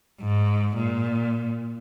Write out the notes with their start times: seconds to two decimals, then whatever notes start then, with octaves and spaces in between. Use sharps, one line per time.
0.20 G#2
0.77 A#2